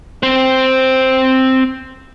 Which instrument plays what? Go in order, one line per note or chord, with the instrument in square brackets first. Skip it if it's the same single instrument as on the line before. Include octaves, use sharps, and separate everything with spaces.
[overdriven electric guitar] C4 C5